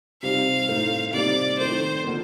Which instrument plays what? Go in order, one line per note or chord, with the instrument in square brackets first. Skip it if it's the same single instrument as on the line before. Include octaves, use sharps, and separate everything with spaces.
[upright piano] C3 G3 C4 D#4 [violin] F5
[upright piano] A2 A3 C4 D#4
[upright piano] C3 G3 A#3 D#4 [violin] D5
[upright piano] D#3 A3 C4 [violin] C5
[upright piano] D3 F3 A#3